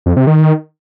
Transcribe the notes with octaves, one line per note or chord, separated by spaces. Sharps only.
F2
C3
D#3